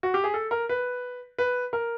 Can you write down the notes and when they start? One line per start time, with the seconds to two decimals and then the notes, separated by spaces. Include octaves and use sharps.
0.03 F#4
0.14 G4
0.24 G#4
0.34 A4
0.51 A#4
0.69 B4
1.38 B4
1.73 A#4